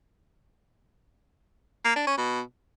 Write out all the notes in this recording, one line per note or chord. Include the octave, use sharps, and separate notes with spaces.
A#3
D4
C#4
B2